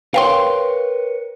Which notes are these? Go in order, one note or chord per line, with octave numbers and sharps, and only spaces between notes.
A#4 B4 C#5 F5 G5 C6